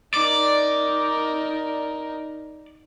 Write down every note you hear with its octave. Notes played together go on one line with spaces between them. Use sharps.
D#4 A#4 D5